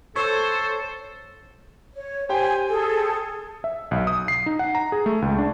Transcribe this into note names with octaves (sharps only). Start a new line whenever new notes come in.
A4 C5 C#5
C#5
G4 C5 G5 G#5
G#4 A4
E5
B1
D#6
C7
D#4
F#5
A#5
G#4
A3
C#2
D4